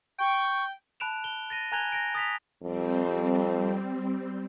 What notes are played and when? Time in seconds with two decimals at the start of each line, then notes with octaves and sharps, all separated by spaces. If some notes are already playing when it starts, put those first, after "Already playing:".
0.19 G5 C#6
1.00 A5 B5 F#6 D7 E7 F7
1.24 G7
1.50 A6 A#6 D#7
1.72 G#5 A#5 F#6 G#6 F7 G7
1.92 A#6 D7
2.15 D#6 A6 B6 F7
2.62 F2 G3 C4